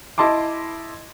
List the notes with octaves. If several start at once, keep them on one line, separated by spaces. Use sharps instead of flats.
E4 D#5 A5 C6 D6